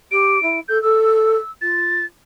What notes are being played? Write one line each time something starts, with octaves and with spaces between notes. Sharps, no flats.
G4 D7
E4
A4 G6
A4 E6
F4 A6